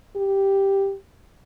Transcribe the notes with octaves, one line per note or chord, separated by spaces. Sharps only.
G4